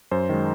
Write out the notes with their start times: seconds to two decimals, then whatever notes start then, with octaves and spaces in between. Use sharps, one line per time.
0.11 F#2 C5
0.29 D#3 G#3